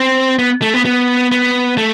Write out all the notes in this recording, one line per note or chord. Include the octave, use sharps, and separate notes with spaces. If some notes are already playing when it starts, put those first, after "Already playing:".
Already playing: C4
B3
A3
B3
B3
B3
A3